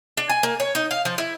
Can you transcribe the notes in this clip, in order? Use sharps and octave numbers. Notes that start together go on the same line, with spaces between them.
D4
G#5
A#3
C#5
D#4
F5
F3
E4